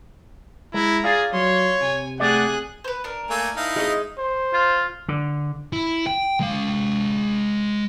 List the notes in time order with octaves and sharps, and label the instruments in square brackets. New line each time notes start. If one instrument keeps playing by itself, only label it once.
[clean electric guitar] G#3 [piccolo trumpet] E4 [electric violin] A#5
[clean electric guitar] F4 D5 F5 [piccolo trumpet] G#4
[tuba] F#3 [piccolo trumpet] C#5 [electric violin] C6
[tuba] C3 [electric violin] G#5
[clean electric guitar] A3 G4 D5 [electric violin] G#4 F#6 [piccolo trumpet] F#5
[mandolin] B4 C5
D4 A#4
[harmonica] A3 A#3 G#5
D#4 E4 F5
[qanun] G#3 C#5 D#5
[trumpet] C5
[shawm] F4
[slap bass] D3
[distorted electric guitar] E4
G5
G#3 F5